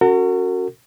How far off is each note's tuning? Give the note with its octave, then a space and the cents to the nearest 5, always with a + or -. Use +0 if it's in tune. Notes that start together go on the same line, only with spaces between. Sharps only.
C#4 +0 F#4 +0 A#4 -45